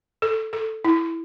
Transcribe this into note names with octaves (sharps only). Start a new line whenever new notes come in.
A4
A4
E4